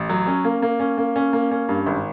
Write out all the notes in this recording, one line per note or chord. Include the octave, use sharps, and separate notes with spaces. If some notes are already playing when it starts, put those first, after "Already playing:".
Already playing: A1
F#3
C#4
A#3
A#3
C#4
A#3
C#4
A#3
C#4
G2
G#1